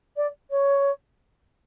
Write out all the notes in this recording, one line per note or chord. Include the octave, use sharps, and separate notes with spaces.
D5
C#5